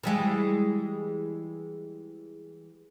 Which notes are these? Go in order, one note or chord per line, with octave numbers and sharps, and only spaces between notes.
E3 G3 G#3